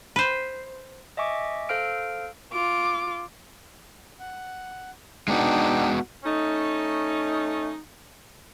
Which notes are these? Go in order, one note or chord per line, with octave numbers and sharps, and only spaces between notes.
B4 C5
D#5 E5 G#5 C#6 D6
A4 C5 F5 F6 D7
F4 D6
F#5
G#3 B3 D4 D#4 F#4 G5
A3 C#4 D#4